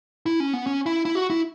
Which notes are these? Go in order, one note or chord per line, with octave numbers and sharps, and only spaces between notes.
E4
C#4
B3
C#4
E4
E4
F#4
E4